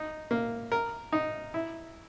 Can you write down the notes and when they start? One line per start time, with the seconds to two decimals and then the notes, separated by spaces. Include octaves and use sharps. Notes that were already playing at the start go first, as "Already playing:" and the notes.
Already playing: D#4
0.31 A#3
0.72 A#4
1.12 D#4
1.54 E4